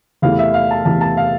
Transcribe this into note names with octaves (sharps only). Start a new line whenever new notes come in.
E2 C3 E3 A3 E4 F5
E5
F5
A5
E2 C3 E3 A3 E4 A5
A5
F5